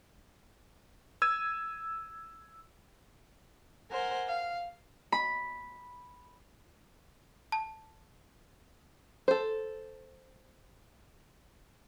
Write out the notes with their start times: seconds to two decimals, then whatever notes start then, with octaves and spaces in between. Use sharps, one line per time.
1.22 E6 G#6 D#7
3.91 A#4 C5 F#5 G#5
4.28 F5
5.12 B5
7.52 A5
9.28 A4 C5